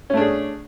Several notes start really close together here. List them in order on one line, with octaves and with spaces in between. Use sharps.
C#4 A3 D4 G#4